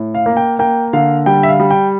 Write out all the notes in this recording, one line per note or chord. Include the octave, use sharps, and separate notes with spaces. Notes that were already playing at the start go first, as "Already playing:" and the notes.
Already playing: A2
F5
A#3
G5
A#3 G5
D3 F5
G3 G5
E5
F5
G3
G5